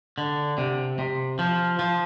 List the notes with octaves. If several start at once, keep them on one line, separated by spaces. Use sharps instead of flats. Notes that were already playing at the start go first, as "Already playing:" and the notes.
D3
C3
C3
F3
F3